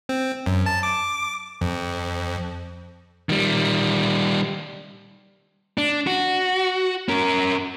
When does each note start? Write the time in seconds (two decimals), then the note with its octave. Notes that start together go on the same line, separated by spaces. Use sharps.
0.09 C4
0.46 F#2
0.66 A5
0.83 D6
1.61 F2
3.29 D#3 G3
5.78 D4
6.07 F#4
7.09 C#4 A#4